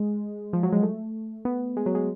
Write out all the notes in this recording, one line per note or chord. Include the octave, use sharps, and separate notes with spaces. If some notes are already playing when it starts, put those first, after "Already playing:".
Already playing: G#3
F3
F#3
G#3
A3
B3
G#3
F#3
G#3